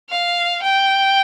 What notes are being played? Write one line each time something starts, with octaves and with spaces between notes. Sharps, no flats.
F5
G5